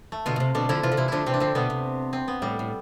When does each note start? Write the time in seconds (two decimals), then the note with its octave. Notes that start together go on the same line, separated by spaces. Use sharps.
0.12 A3
0.26 B2 D3 F4
0.36 B2
0.40 C3
0.55 B2 D3 D4
0.69 D3 F3 E4
0.83 C3 E3 F4
0.92 D3
0.97 C3 E3 E4
1.08 D3 F3 D4 E4
1.26 C3 E3 C4
1.34 D4
1.40 D3 F3 C4
1.55 B2 D3 B3
1.70 C3
2.13 C4
2.28 B3
2.42 A2 G3
2.59 A2